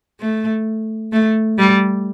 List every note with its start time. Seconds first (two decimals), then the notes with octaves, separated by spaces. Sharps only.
0.20 A3
1.12 A3
1.58 G3